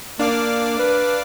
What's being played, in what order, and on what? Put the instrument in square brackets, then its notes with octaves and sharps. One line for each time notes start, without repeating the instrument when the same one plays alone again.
[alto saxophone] A#3 [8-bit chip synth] D4 F5 D6
[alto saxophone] B4